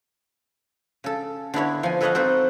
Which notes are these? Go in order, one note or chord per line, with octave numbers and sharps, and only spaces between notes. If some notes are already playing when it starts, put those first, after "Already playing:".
C#3 A4
D3 B3 E4 C#5
F3 G#5
A4 B4 C#5 D#5 F5 F#5
C4 D#4 F#4 A4 B4 C5